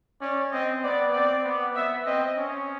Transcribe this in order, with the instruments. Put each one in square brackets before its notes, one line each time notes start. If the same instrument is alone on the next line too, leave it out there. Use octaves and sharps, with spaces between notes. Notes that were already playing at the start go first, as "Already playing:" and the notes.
[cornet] C#4 [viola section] D5
[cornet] C4 [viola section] D#5
[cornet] B3 [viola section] D5
[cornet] C4 [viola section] D5
[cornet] B3
[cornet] B3 [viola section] E5
[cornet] C4 [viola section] D#5
[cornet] C#4